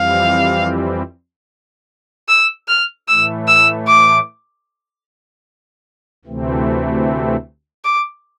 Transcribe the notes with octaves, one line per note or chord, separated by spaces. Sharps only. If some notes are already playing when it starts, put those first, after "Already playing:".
Already playing: F2 E3 G3 C4 F5
E6
F6
A2 E3 A3 E6
E6
D6
D2 C3 E3 A3 C4
D6